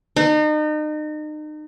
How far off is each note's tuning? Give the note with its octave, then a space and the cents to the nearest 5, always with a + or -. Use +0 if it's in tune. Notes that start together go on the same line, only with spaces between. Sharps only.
D#4 -35